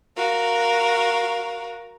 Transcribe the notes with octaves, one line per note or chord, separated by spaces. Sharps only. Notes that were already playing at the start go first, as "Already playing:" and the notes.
F#4 A#4 F5